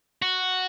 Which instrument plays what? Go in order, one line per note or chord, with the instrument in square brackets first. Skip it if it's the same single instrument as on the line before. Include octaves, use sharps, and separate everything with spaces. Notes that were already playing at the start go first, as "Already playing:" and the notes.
[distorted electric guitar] F#4